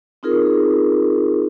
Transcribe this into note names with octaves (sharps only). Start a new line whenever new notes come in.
C4 D#4 F4 G#4 A#4